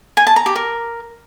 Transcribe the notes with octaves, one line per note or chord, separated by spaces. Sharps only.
G#5
A5
A#5
G4
A#4